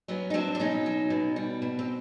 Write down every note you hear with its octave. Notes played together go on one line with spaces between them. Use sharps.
F#3 B3 C#4
D#4
F#3 C4 D4
D4
B2 C#4 D#4
F#3
B2
G3
B2
C4